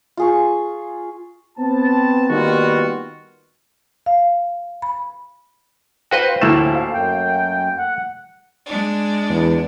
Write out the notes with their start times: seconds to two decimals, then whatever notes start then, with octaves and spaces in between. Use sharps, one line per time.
0.17 F4 G#4 C#6
1.58 B3 C4 A5
2.29 D#3 G3 A#3 B3 F4 F#4
4.06 F5
4.82 B5
6.11 F#4 B4 C5 D#5 F5 G5
6.41 D2 A2 F3 A3 A#3 E4 E7
6.74 F5
6.93 F#2 G5
7.78 F#5
8.67 G#3 D4
9.29 E2